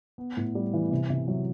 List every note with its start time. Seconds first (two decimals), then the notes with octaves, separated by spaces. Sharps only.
0.18 B3
0.37 A2
0.55 G3
0.74 E3
0.91 C3
1.10 C3
1.28 F#3